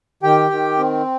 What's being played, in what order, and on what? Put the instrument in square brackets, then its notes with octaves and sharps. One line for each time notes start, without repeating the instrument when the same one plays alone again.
[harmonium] D#3 G4 G5
D#3
C4